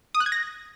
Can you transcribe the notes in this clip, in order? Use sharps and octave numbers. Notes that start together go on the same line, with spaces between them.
D#6
F#6
G#6
A#6